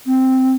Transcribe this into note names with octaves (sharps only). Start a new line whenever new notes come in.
C4